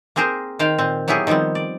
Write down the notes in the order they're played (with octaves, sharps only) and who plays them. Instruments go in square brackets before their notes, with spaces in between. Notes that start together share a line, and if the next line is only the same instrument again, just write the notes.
[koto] A#3 C4 G#4 A#4 C5
D#3 C5 F5 G5
A#2 C4
F#3 B3 E4 G4 G#4
D#3 F3 G3 B3 C4
D5